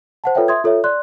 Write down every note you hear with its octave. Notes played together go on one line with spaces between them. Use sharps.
C5 F#5 A5
F4 A4 B4 C#5 E5 G5
E5 C6 D#6 G#6
F4 A4 C#5 E5
D5 C6 F#6